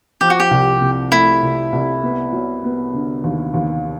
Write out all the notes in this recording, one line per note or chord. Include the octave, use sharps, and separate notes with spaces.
F3 G4
F#4
G4
C2
C3
A3 E4
C2
C2
B3
F#3
B3
D3
D#2
D#2